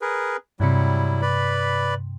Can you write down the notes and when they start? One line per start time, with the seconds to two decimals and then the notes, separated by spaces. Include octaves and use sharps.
0.01 G#4 A#4 B4
0.60 G2 C3 F#3 G3 E4
1.22 B4 D5 B5